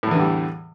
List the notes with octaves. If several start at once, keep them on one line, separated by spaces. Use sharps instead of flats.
E2 A2 D3 E3 G3